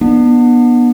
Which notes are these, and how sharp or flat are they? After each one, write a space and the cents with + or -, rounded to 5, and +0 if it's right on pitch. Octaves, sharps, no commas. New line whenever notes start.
B3 -25 D4 +30